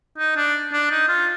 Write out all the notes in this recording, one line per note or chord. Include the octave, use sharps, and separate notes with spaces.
D#4
D4
D4
D#4
F4